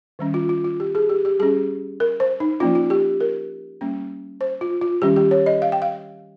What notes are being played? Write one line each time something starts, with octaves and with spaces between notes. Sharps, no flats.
D#3 G3 C#4
F4
F4
F4
G4
G#4
G4
G4
G3 C#4 G#4
A#4
C5
D#4
F3 A#3 C#4 F4
F4
G4
A#4
G3 A#3 C#4
C5
F4
F4
D#3 G3 C#4 G4
G4
C#5
D#5
F5
G5
F5